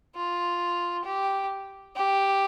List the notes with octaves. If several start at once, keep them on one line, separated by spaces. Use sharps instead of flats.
F4
G4
G4